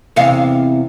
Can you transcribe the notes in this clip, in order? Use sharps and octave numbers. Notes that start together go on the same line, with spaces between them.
E2 C3 F5